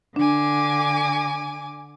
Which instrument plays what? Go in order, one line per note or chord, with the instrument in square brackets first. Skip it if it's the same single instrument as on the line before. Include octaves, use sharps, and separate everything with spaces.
[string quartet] D3 G#5 D6 [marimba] D4